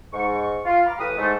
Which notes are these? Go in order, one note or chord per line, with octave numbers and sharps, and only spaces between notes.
G#2 C#6
F4
F5 A#5 B5 D6 F6
A2 E3 G4 B4 D#6
G#2 A3